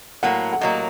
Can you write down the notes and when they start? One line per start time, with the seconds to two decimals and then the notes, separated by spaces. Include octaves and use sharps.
0.23 A2 F#3 A#3 F#5
0.53 F#5
0.61 A2 F#3 A#3 D#5